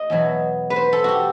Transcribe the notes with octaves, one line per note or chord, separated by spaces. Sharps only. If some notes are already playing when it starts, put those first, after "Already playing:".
Already playing: D#5
E2 B2 F#3
B4
C5
A4
F#4 G4